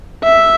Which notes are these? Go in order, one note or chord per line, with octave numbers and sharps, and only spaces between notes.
E5